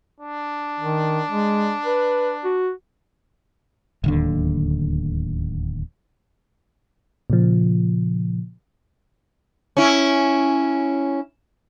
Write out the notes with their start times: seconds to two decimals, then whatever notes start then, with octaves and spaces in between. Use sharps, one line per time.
0.20 D4
0.80 D#3
1.31 G#3
1.85 B4
2.44 F#4
4.04 D1 D#2 D3
7.30 A#2 C#3 F3
9.77 C#4 E4